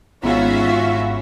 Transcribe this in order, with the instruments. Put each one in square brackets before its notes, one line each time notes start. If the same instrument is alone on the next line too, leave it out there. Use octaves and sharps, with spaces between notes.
[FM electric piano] G#1 G#2 B5 [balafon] B3 [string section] C#4 F#4 E5 [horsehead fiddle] F4